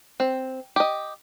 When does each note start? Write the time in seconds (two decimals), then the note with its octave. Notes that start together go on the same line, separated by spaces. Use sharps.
0.20 C4
0.76 G4 D#5